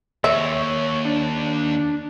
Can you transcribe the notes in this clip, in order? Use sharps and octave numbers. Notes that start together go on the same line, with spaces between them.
D#2 C#5 E5
D4